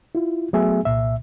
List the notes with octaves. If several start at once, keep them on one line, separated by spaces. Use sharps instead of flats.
E4 F4
F#3 A3 B3 G#4 E5 G#5
C2 A#2 E5